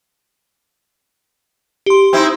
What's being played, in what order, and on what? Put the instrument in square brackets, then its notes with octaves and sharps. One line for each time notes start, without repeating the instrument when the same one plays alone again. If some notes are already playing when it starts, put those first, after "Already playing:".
[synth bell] G4 C6
[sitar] C4 D#4 E4